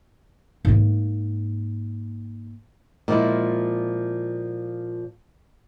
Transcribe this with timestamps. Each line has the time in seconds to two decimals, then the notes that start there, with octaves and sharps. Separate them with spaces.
0.65 G#2 A#3
3.08 A#2 F3 G#3 E4